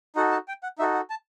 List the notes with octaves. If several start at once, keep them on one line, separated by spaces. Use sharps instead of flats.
D#4 F#4 A4 F#5
A5
G5
F#5
D#4 F#4 A4 E5
F#5
A5